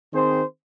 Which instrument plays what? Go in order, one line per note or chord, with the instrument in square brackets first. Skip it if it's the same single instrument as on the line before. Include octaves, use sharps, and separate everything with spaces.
[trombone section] D#3 C4 G#4 C5